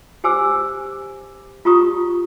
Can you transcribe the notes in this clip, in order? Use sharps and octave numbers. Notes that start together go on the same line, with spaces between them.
G4 C5 G#5 D6 E6
F4 G4 A#5 C#6 D#6